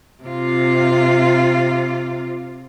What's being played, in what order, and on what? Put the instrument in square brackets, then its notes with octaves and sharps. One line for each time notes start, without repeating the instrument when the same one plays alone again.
[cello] C3 F4